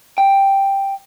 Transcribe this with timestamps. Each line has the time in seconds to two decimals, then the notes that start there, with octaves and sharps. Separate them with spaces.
0.18 G5